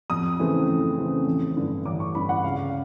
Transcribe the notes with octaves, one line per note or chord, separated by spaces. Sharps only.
F2 D#6
C#3 E3 A3 C4
F2
C#3 E3 A3 C4
A1
G2 D3
A1 D6
C#6
G2 D3 B5
F#5
C#2 F5